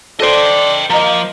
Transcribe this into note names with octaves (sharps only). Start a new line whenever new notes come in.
D4 A4 C5 D#5 G5
F3 A#3 D#5 A#5